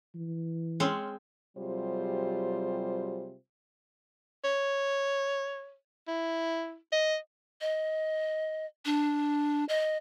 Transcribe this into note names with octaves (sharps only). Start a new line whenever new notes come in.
E3
G#3 C4 C#4
C3 F#3 G3 F4 G#4 C5
C#5
E4
D#5
D#5
D4
D#5